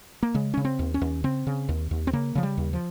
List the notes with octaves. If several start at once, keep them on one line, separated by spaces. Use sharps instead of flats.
A#3
C#3 G#3
C#3 C#4
C4
D#2
C#4
D#2
C#3 C4
C#3
D#2
D#2
C4
C#3 A#3
C#3 F3
G3
D#2
F3